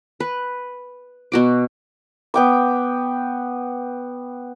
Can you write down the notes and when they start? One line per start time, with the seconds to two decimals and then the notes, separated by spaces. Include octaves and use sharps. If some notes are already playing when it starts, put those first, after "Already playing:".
0.20 B4
1.32 B2 F#4 D6
2.34 B3 G5 D6